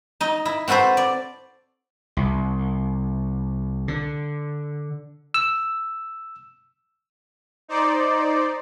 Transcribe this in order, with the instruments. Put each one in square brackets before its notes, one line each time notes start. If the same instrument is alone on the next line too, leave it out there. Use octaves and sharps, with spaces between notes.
[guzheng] D#4 D#5
E4
C4 F#4 A4 B4 C5
D5
[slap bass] C2
D3
[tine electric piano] E6
[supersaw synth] D#4 C5 D5